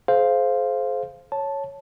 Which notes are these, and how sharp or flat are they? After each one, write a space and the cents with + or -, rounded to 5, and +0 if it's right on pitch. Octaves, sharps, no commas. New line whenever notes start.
G#4 +45 C5 +0 F5 -5
C#5 +0 A5 +0